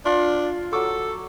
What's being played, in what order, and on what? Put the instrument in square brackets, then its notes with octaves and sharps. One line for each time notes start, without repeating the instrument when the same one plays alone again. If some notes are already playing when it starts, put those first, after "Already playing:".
[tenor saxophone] D4 [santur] F4
[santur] F#3 C#5 D6 [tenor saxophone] A4